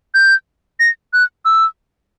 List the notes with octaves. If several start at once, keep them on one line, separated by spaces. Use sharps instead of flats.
G6
A#6
F#6
E6